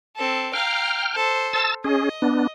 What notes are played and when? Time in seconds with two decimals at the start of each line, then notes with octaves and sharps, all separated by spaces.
0.16 C4 A4
0.53 F5 G5 A#5 F6
1.14 A4 C5
1.53 A5 E6 A6
1.84 C#4 G#4 D#5
2.22 B3 D4